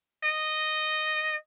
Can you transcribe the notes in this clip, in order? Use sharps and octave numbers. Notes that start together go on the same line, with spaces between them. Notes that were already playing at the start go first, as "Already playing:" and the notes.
D#5